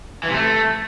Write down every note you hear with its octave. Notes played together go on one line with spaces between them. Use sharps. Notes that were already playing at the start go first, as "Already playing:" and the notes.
E3
C3
A3